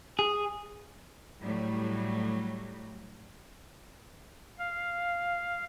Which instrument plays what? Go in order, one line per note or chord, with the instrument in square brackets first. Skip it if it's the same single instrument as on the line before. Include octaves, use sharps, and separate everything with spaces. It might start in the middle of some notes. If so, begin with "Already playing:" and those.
[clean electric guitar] G#4
[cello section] A2 F#3 G3 A3
[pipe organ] F5